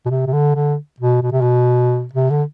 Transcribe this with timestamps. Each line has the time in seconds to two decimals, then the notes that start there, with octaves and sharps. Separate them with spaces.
0.06 B2
0.10 C3
0.27 C3
0.33 D3
0.55 D3
1.00 B2
1.23 B2
1.32 C3
1.41 B2
2.14 C3
2.30 D3